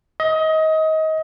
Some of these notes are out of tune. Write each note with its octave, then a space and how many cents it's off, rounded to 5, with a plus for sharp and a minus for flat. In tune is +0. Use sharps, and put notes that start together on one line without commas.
D#5 +25